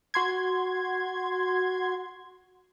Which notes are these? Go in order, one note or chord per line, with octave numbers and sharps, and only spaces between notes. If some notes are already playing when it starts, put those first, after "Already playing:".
F#4 C6 G#6